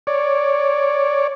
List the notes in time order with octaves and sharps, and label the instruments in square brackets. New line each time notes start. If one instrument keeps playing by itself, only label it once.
[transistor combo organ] C#5 D5